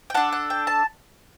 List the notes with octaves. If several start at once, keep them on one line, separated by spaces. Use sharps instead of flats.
G5
D4 A4 F#5
F#5
G5
A5